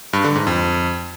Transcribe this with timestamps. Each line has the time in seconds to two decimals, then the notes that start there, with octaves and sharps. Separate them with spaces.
0.13 G2
0.24 D3
0.35 G#2
0.47 F2